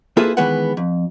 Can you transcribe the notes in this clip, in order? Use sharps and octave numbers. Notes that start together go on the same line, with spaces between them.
A#3 E4 F4 G#4 A4 B4
D#3 E3 G#3 B3 B4 F#5
F2